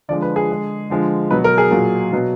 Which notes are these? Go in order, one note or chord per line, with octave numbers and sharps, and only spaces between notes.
D3 F3 G#3 D5
B4
G#4
D3 G#3
D3 F3 G#3
B2 F#3 B4
A#4
G#4
A#2 F#3
B2 F#3